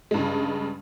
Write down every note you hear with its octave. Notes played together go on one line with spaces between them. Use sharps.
G2 C#3 G#3